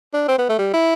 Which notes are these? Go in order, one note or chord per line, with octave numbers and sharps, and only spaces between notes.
D4
C4
B3
A3
G3
E4